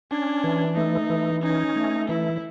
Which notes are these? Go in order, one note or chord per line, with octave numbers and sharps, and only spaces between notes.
C#4 D4
E3
A3 D#4
E3
C#4 D#4
A3
E3 E4